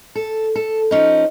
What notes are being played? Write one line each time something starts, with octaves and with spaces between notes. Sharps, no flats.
A4
A4
F3 C#4 D#4